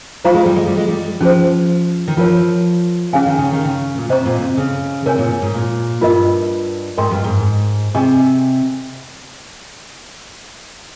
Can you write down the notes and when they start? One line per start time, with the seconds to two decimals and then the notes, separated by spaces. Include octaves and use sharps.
0.25 G3 F4 C5 F5 A#5 C#6
0.34 G#3
0.46 G3
0.56 G#3
0.67 G3
0.77 G#3
0.88 G3
1.21 F3 C#4 G#4 C5
2.08 D#3
2.17 F3 F4 A#4 C#5
3.13 C#3 C#4 G#4 C#5 F5 G#5
3.26 D#3
3.38 C#3
3.51 D#3
3.65 C#3
3.98 A#2
4.09 C3 C5 D#5 A#5 C#6
4.25 A#2
4.41 C3
4.57 C#3
5.06 C3 A#4 C#5 G#5
5.18 A#2
5.42 G#2
5.54 A#2
6.01 G2 F4 A#4 D#5
6.97 G#2 A#4 D#5 G5 C6
7.11 G2
7.24 G#2
7.94 C3 G#4 D#5 G#5 C#6